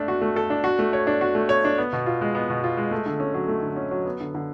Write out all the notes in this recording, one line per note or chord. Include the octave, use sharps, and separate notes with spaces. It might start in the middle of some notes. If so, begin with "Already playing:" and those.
Already playing: A3 D4 A4
F#4
A3
A4
D4
F#4
A3
C#5
D4
F#4
A3
C#5
D4
B3
B2
F4
G#3
B3
B2
F4
G#3
A3
D3
C#4
F#3
A3
D3
C#4
F#3
B3
D3
D3